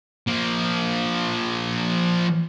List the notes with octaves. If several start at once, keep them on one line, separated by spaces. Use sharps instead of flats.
F3 A#3